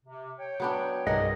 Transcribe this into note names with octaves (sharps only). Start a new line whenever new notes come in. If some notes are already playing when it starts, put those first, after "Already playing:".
C3
C#5 G5
F#3 B3 D4
C2 G2 G#4 A#4 D#5 F#5